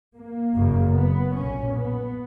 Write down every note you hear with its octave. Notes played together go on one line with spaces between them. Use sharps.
A#3
F#1 F#2 C#3
B3
B1 A#2 C#4
B3